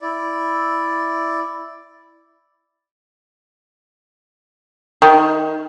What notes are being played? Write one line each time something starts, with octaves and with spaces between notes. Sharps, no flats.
E4 D5
D#3